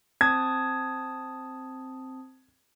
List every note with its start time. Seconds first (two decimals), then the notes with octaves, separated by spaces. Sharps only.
0.21 C4 A5 D#6 G#6